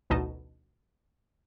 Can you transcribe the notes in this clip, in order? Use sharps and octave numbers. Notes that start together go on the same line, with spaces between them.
A1 D2 B2 D#4 D#5 A5